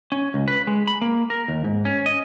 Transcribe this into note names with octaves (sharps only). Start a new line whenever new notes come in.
C#4
C#2
B4
G#3
B5
A#3
A#4
D#2
G#2
C#4
D#5